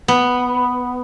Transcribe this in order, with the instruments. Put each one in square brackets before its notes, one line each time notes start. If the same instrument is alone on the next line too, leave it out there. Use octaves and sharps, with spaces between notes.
[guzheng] B3